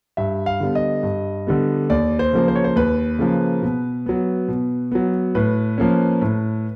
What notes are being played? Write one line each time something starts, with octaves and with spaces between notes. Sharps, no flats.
G2 E5
F5
D3 G3 B3
D#5
G2
D3 G3 B3
D#2 D5
C5
C#3 F3 A#3
C5
C#5
C5
D#2 B4
C#3 F3 A#3
B2
F#3 B3
B2
F#3 B3
A2 B4
F3 A#3 C#4
A2